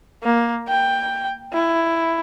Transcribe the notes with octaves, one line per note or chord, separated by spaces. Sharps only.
A#3
G5
E4